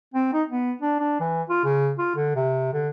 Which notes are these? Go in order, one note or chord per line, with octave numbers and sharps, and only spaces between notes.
C4
D#4
B3
D4
D4
E3
F4
C#3
F4
D3
C3
D3